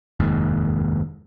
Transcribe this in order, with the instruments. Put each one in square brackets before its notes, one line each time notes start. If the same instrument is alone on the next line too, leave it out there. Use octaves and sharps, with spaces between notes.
[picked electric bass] F1 D#2 G#2